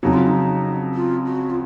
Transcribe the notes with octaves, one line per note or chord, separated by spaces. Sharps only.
F2 C#3 F#3 D#4
F4
D#4
F4
F#4
F4